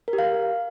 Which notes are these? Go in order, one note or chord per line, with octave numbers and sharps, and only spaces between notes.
A#4
G4
F5